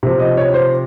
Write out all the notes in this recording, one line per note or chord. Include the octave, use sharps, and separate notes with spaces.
C3 F3
D#5
C#5
C5